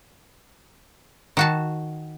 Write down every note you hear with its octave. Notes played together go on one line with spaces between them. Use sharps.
D#3 F#4 A5